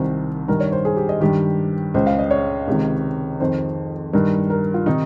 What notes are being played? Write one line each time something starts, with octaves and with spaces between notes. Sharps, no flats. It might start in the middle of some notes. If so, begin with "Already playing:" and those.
Already playing: C2 C3 D#3 C5
G2 D#3 A#4
C#5
C5
G#4
G4
D#5
G2 D#3 G4
C#2 C#3 C5
F5
D#5
C#5
C#2 C3 D#3
F2 D#3 C5
G2 D#3 A#4
A#4
F4
C3 D#3 D#4